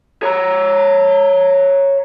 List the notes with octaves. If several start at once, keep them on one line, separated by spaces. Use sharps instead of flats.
C#5 A#5